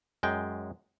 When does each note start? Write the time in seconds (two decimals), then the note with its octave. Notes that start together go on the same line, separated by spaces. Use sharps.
0.23 F#2 G#3 G5